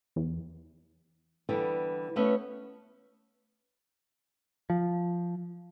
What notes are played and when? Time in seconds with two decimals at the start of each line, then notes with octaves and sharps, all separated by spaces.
0.16 E2
1.49 D3 E3 G3 B3
2.16 A3 B3 C#4 B4 E5
4.70 F3